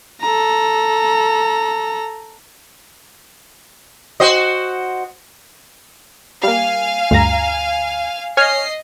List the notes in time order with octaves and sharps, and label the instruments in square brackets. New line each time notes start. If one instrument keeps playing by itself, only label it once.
[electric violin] A4 A#5
[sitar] F#4 C5 D#5
[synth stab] G3 A#3 [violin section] F5 G#5
[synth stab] D2 G2 A#5
[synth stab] C#5 G#5 F6 [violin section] D#5 C7